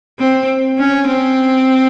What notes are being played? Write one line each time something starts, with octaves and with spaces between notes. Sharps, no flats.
C4
C#4
C4